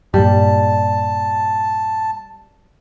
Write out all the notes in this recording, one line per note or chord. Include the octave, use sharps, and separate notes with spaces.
G2 A#2 G3 A5